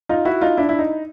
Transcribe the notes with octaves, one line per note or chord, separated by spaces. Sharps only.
D#4 F4
E4 F#4
D#4 F4
D4 E4
E4
D#4